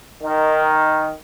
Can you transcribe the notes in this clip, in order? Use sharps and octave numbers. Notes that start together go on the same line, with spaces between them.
D#3